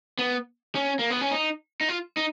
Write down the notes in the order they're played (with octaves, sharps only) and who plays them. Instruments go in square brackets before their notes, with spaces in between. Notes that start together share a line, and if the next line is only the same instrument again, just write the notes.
[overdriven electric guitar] B3
C#4
A#3
B3
C#4
D#4
D#4
F4
D#4